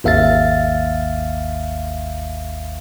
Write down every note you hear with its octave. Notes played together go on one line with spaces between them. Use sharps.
G#1 D#2 E5 F5 A6